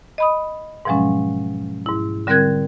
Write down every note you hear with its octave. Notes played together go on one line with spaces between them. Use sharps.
D#5 B5 D#6
G#2 B2 F3 F#3 G#3 C#4
G#2 E4
D3 G3 C4 A#4 F#6 G#6